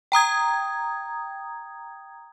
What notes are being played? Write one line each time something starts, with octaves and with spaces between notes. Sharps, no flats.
G5 A#5 D#6 G#6